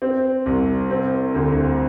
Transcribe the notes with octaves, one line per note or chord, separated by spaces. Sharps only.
C4
C2
C4
D2